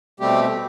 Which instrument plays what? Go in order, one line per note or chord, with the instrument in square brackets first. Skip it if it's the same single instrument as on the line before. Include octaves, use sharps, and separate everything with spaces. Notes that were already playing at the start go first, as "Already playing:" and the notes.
[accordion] B2 G3 A3 C4 G4